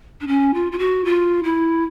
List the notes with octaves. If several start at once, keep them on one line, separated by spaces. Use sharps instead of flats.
D4
C#4
F4
F4
F#4
F4
E4